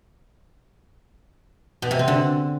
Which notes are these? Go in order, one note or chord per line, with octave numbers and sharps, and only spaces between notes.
B2
C3
C4
D3